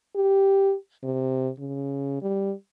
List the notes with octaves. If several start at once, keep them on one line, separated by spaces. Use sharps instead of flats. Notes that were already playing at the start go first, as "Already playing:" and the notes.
G4
C3
C#3
G3